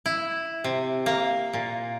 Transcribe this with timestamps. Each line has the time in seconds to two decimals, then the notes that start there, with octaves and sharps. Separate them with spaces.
0.06 E4
0.64 C3
1.06 A#3
1.53 A#2